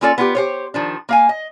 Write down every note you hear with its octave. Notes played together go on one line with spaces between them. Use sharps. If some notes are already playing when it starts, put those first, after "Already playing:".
A#3 C#4 F4 A4 D5
B3 F4 G4
G4 C5 C#5
D#3 F3 D4
A#3 F5 G#5
D#5